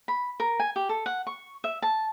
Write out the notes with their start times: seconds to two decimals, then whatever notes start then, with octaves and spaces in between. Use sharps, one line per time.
0.08 B5
0.40 A#4
0.60 G#5
0.76 G4
0.89 A4
1.06 F#5
1.27 C#6
1.64 E5
1.82 A5